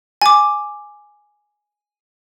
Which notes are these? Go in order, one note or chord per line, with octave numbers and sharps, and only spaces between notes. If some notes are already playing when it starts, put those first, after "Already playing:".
G#5 D6